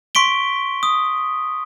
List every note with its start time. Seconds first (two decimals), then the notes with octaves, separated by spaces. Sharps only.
0.15 C6 C#6 B6 D7 G7
0.83 D#6